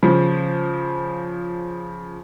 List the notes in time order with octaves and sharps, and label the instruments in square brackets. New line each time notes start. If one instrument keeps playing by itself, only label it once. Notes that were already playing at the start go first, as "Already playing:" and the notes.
[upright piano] C#3 F3